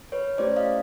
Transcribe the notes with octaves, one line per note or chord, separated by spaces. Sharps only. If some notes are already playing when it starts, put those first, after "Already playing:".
B4 C#5
A3 C#4 E4 G4 C5 D5
D#5 F5